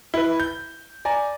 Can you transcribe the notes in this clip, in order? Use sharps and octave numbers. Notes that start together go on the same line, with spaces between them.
E4 B4
G6
D5 G#5 A#5